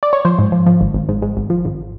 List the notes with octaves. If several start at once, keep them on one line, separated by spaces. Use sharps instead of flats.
D5
C#5
F3 C5
G#2
F3
F3
G#1
G#1
G#2
G#2
G#1
F3
G#1